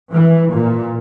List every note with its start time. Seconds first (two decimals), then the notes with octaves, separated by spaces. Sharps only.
0.13 E3
0.52 A#2